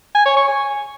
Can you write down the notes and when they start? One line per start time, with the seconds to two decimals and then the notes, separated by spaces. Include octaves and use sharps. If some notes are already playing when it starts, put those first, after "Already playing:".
0.15 G#5
0.26 C#5
0.36 C#6
0.47 G#5